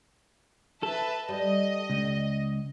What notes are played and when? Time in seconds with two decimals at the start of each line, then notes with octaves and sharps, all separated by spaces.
0.83 A4 B4 E5 A5
1.29 G3 D#5
1.90 C#2